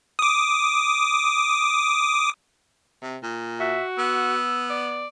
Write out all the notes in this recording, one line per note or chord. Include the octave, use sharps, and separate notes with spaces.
D6 D#6
C3
A#2
F#4 E5
B3 E6
D5